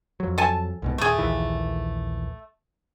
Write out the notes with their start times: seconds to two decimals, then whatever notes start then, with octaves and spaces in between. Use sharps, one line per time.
0.20 F2 F#3
0.38 A4 G#5 A5
0.82 C2 G#2 B2
0.98 D#1 A3 G#4
1.19 A#1 D#2 E3